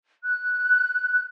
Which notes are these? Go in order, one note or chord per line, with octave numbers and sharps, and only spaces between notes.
F#6